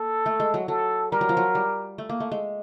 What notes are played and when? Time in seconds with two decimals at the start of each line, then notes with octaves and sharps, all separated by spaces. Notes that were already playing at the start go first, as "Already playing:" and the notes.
Already playing: A#3 A4
0.26 A3
0.40 G#3
0.54 F#3
0.68 F#3 A4
1.12 G3 A#4
1.21 F#3
1.29 F3
1.37 F#3
1.55 G3
1.98 A3
2.09 A#3
2.20 A3
2.32 G#3